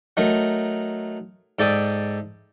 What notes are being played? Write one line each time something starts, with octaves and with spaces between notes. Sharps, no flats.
F#3 A3 D#4 A#4
G#2 A4 D5 E5 G5 D#6